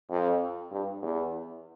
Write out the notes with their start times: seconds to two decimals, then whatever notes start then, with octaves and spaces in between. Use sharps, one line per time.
0.11 F2
0.72 G2
1.02 E2